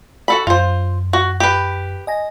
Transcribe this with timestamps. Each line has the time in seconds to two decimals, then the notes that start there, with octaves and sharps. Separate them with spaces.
0.28 F#4 A4 B5 B6
0.47 F#2 F4 C5
1.13 F#4
1.40 G4 B4
2.07 D#5 G#5 A#6